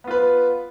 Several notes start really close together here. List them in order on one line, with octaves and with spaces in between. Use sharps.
B3 F4 B4